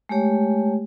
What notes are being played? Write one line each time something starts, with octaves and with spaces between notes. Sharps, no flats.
G#3 A3 G4 C#5 G5